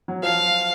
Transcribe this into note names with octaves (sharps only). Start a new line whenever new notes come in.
F#3
F3 F5